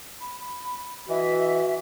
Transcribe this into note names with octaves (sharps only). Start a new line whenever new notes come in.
B5
E3 F#4 D#5 E5